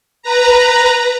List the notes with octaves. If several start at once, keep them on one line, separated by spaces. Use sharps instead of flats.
B4 A#5